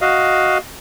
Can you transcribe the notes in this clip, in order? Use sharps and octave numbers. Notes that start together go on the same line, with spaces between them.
F#4 D#5 F5